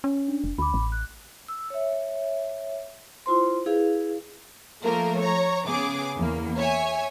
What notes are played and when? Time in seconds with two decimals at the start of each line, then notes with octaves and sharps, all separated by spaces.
0.04 C#4
0.28 D4
0.44 F1
0.58 D2 B5 D6
0.74 A1
0.92 F#6
1.48 E6
1.70 C#5 E5
3.26 E4 F4 C5 C6
3.66 E4 G#4 B4 F5
4.83 F3 A3 A#3 A#4
5.20 C#5 A#5
5.66 C#3 B3 G#4 D6
6.17 E2 A#3
6.57 C#5 E5 G#5